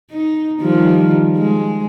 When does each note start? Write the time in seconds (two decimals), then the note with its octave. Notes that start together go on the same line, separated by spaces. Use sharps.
0.11 D#4
0.62 D#3 F3 G3
1.37 G#3